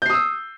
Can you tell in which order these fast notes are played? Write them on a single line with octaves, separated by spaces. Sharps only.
G6 C7 D#6 E6